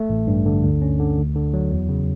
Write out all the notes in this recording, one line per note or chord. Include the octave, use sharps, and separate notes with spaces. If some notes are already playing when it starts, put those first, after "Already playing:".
Already playing: A3
A1
G2
D3
D2
C#4
D3
D2
D3
F#3
E2
C#3